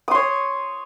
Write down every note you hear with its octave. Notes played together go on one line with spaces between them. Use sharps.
C#5 C6 D#6